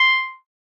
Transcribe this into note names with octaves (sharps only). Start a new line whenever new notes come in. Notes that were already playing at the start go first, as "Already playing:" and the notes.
Already playing: C6